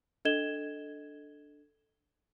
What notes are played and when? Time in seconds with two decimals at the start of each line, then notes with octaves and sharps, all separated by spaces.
0.25 D4 A4 D#5 G#6 E7 G7